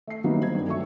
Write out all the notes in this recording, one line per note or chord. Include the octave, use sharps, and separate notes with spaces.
A3 C7
D#3 F#3 G3 A#3 B3 D#4
C4 G#6
G2
D2 F#3 E5 C#6